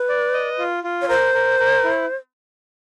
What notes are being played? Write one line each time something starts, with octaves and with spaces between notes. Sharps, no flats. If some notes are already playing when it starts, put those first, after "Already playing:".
Already playing: B4
D5
D#5
F4
F4
C#5
A#4 C5
A#4
A#4
E4